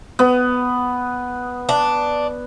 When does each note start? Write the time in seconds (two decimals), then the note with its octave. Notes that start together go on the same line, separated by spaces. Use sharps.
0.19 B3
1.69 D4